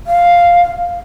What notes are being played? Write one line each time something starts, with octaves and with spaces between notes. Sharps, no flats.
F5